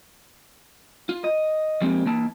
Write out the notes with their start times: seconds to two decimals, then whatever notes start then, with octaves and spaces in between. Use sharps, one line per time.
1.09 F4
1.24 D#5
1.81 F3 G#3 A#3 C4 G4
2.06 E3 A#3 A5